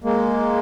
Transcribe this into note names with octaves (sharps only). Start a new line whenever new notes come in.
G#3 A#3